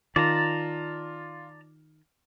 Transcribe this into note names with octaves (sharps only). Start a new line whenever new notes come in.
D#3 F4 D5 A5 A#5